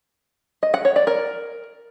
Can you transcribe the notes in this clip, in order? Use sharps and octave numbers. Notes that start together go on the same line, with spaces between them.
D#5
F#5
C#5
D5
A#4